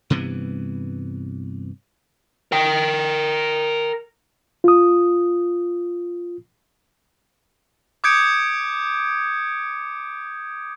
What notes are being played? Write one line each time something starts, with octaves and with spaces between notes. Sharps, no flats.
G2 C3 E3 B3
A#4 G5
F4 D#6
D6 D#6 G6 G#6 C#7 D7